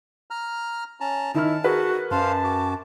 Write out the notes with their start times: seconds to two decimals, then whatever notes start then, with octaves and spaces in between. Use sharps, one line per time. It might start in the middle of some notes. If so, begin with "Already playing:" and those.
0.31 A#5 F6
1.00 C#4 A5 A#5
1.34 D#3 D#4 E4 A5 F6
1.64 F#4 G#4 A#4 B4
2.11 F#2 C5 F5 A5
2.44 F#4 D6